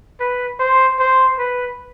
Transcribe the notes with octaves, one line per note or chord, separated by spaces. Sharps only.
B4
C5
C5
B4